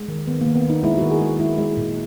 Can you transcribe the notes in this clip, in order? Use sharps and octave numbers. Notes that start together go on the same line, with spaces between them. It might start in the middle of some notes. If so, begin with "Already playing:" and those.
Already playing: G#3
D#3
D#3 B3
A#3
D#3
B3
D#3
D#4
G#3 E4
F#4
D#3
G#4
G#3
G#3 E4
G#3
A#2